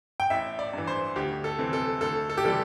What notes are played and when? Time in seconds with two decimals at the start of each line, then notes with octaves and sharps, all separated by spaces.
0.20 G5
0.30 A1 E5
0.59 D5
0.73 G2 E3
0.87 C5
1.16 D2 G4
1.44 A4
1.58 C3 E3 C4
1.73 A4
2.01 D2 A4
2.30 A4
2.38 G4
2.44 C3 E3 G3 C4 A4